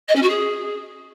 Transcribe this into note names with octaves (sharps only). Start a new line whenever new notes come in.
D#5
C#4
F#4
G#4